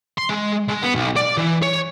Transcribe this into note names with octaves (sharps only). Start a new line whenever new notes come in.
C6
G#3
G#3
B3
B1
D5
E3
C#5